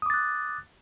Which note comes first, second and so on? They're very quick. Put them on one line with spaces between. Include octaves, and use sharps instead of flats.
D#6 D6 A6 F#6